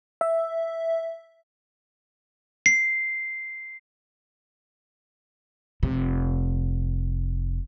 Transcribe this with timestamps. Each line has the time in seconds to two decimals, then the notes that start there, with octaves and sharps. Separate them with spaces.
0.21 E5
2.66 C7
5.83 F1 C3